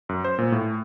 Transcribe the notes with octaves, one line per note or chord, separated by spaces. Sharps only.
F#2
C5
A#2
A2